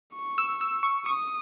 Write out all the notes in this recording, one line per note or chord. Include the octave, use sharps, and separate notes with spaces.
C#6
E6
E6
C#6
C#6 D#6